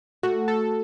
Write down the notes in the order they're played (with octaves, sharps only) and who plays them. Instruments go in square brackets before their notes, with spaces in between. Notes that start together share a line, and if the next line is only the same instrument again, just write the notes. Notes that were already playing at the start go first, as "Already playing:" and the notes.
[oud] A3 [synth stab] F#4
[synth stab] A4